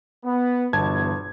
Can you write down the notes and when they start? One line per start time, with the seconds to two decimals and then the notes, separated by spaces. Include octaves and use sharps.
0.24 B3
0.73 G1 E2 B2 A5 G#6